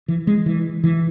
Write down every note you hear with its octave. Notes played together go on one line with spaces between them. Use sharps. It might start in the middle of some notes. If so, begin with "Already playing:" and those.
E3
G#3
E3
E3